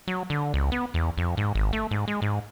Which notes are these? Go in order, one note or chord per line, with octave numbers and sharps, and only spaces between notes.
F#3
D3
C#2
B3
E2
F2
G#2
G#1
A3
G#2
G#3
G#2